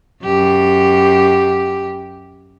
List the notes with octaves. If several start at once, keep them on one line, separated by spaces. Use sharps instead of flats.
F#2 G4